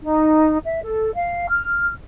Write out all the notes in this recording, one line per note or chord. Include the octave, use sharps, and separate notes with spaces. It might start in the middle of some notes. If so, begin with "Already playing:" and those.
D#4
E5
A4
F5
F6